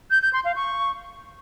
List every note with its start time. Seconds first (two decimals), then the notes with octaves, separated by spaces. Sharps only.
0.11 G6
0.22 G6
0.33 C6
0.44 F5
0.56 C#6